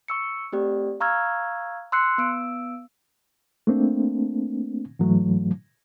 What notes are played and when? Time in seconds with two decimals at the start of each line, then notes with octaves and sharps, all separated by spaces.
0.08 C#6 E6 C#7
0.52 A3 C4 G4 D5
1.00 F5 A#5 C#6 E6 F6 G#6
1.92 C6 E6 F#6 C7 C#7
2.18 B3 E6 D7
3.67 A3 A#3 C4 D4
4.99 G#2 E3 F#3 A3